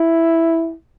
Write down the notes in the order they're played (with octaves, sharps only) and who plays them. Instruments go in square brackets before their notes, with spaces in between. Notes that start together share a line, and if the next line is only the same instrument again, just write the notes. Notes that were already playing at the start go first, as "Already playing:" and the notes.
Already playing: [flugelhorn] E4